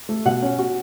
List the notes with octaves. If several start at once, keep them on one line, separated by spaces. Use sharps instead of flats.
A3
B2 F#5
C#4
F#4